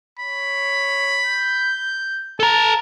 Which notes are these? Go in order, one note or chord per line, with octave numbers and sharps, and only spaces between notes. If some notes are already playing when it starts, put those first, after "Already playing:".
C#5 B5
G6
A4 A5 A#5